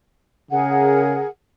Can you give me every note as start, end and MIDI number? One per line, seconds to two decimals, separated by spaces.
0.51 1.21 49
0.51 1.27 68
0.51 1.27 70
0.51 1.27 78